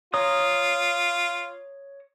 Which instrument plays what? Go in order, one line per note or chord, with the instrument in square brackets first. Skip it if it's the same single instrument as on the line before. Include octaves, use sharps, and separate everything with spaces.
[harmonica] F4 [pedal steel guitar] C#5 A#5 D#6